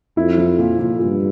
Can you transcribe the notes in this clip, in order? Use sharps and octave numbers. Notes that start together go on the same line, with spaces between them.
F2 E4
F3
A#2
A#2
G2 A#2